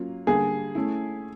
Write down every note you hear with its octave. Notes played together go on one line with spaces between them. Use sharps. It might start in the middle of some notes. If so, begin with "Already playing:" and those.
Already playing: F#3 A#3 C#4 F4
D3 G3 A#3 D4 G4 G#4
A3 C#4 E4